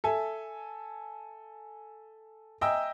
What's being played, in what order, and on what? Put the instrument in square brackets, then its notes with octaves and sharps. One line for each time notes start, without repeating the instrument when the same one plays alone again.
[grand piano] A4 E5 G#5
D#5 E5 G5 G#5 A#5 E6